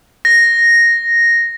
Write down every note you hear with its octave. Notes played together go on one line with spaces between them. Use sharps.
A#6